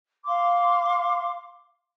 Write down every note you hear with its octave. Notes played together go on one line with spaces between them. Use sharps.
F5 C6 D6